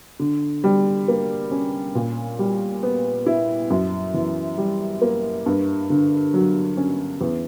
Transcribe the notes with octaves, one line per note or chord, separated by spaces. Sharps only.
D3
G3
A#3
C#4
A#2
G3
B3
E4
F#2
E3
G3
A#3
G2
D3
F#3
C#4
E2